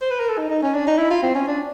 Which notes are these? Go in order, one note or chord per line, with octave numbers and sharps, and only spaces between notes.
C5
B4
A#4
A4
D#4
D#4
C#4
D4
D#4
E4
F4
C4
C#4
D4